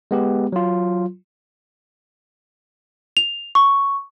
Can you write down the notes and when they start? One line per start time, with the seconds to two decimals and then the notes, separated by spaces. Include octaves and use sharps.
0.11 G#3 B3 G4
0.52 F#3 F4
3.17 F7
3.55 C#6